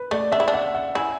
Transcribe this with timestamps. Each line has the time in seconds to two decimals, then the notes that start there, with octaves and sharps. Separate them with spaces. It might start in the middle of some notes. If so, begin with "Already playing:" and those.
Already playing: B4
0.11 A3 D5
0.32 D4 E5
0.40 E4
0.48 D4
0.54 F#5
0.75 F#5
0.95 E4 G#5